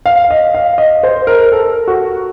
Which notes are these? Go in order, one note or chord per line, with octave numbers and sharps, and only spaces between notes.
F5
D#5
F5
D#5
C5
A#4
A4
F#4